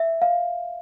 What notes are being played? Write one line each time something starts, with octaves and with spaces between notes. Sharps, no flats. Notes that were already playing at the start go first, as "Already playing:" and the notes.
Already playing: E5
F5